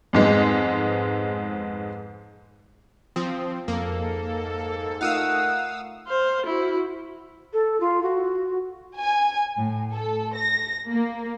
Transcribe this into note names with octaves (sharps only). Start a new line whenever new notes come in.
F2 G#2 G#3 B3
F3 C4 D#6
F2 G#2 A#3 A4
A3 D#4 F4 A#4 F5 F#5 D#6 E6
C5 F5
E4 F#4
A4
F4
F#4
G#5
A2
A4
A#6
A#3